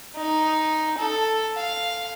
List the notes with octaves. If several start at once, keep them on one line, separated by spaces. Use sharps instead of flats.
D#4
A4
F5